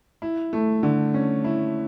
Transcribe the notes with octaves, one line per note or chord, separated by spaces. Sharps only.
E4
A3
D3
C#4
E4